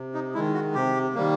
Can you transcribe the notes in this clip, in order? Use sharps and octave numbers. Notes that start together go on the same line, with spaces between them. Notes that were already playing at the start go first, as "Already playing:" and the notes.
Already playing: C3
D#4
D#3 G#3 E4
F#4
C3 G4
D#3 G3 A#3